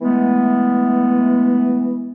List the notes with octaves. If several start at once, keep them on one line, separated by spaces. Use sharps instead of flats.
E3 G#3 A3 B3